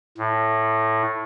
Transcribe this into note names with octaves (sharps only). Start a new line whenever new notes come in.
A2